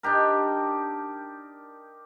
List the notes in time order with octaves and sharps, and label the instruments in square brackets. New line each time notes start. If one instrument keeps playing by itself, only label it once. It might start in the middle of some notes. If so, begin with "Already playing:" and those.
[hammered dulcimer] D4 D#4 G4 A#4